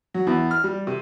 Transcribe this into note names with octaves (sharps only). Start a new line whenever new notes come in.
F#3
E2
F6
G3
C3